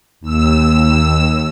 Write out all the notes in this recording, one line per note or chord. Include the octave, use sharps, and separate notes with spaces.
D#2 E6